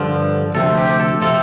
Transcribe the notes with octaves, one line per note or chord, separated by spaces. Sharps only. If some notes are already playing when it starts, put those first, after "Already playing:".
Already playing: G2 D3 F3
D2 C3 F3 C4 A4
G4
A4
C3 F3 C4 A4